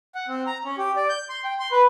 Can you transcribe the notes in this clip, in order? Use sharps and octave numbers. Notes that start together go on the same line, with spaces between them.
F#5
C4
A#5
C#4
G4
D5
G6
C6
G5
C6
B4